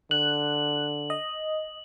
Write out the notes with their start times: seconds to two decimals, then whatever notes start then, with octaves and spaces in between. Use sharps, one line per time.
0.11 D3 F#6 F#7
1.10 D#5